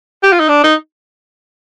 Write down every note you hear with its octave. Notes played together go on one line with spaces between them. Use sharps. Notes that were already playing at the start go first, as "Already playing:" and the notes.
G4
F4
D#4
D4
D#4